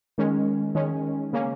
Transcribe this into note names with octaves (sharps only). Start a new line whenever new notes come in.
D#3 G#3 C#4
D#3 G#3 C#4
C#3 A#3 C#4